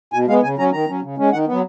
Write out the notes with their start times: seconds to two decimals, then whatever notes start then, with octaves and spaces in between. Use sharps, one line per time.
0.13 B2 G#5
0.28 G#3 B3 F5
0.43 C#3 G#5
0.58 F#3 C#4 A#5
0.73 D#3 A#5
0.88 F#3 C#4
1.03 C#3
1.18 G#3 C#4
1.33 D#3 F#5
1.47 F#3 B3